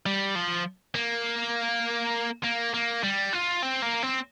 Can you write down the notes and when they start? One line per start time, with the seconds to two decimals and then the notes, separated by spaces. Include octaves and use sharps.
0.06 G3
0.35 F3
0.95 A#3
2.44 A#3
2.74 A#3
3.03 G3
3.33 F4
3.62 C4
3.82 A#3
4.02 C4